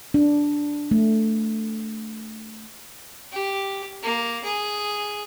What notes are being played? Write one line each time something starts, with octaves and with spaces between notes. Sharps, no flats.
D4
A3
G4
A#3
G#4